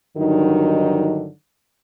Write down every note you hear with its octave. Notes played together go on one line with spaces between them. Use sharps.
G2 D3 D#3 F#3 D#4